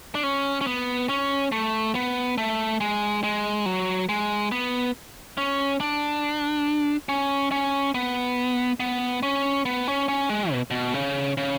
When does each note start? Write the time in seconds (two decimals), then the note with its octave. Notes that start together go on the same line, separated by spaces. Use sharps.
0.15 D4
0.23 C#4
0.61 C#4
0.67 B3
1.09 C#4
1.52 A3
1.95 B3
2.38 A3
2.81 G#3
3.24 G#3
3.66 F#3
4.09 G#3
4.52 B3
5.37 C#4
5.80 D4
7.09 C#4
7.52 C#4
7.94 B3
8.80 B3
9.23 C#4
9.65 B3
9.88 C#4
10.08 C#4
10.29 G#3
10.52 B2
10.71 B2
10.94 C#3
11.37 C#3